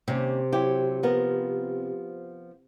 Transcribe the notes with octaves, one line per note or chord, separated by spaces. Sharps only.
D#2 C3 C#4
F#3 E4 G4
F3 B3 A#4